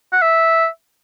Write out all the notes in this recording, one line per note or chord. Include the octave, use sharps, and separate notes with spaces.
F#5
E5